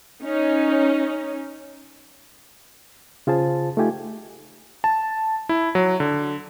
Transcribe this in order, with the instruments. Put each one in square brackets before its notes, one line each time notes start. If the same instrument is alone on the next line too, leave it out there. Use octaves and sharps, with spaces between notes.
[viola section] C#4 D#4
[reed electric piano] C#3 F4 G#4 C5 A5
A3 D#4 F4 G4 G#5
[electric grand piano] A5
E4
F#3
D3